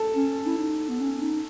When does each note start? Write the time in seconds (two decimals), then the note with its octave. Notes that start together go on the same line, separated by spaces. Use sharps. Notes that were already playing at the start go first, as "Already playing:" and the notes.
Already playing: A4
0.15 C#4
0.46 E4
0.58 D#4
0.89 B3
1.00 C#4
1.22 D#4